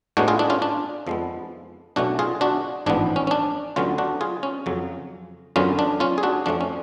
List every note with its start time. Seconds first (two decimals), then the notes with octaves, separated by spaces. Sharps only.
0.17 A2 G#3 B3 D4 F#4
0.28 F4 G#4
0.39 D4
0.50 C#4 F4
0.62 D4
1.07 F2 F3 G#3 B3
1.96 B1 B2 A3 C#4 D4 F#4
2.19 F4 G#4
2.41 D4 F#4
2.86 A1 G#2 F3 B3 D4
3.16 C#4
3.27 C#4
3.31 D4
3.76 D2 D3 F#3 B3 C#4 F4
3.98 D4 F#4
4.21 F4 G#4
4.43 C#4
4.66 F2 C#3 F#3
5.56 F#2 D3 F#3 B3 C#4 F4
5.79 D4
6.00 C#4 F4
6.18 G#4
6.23 D4 F#4
6.46 F2 F3 A3 C#4 D4
6.61 C#4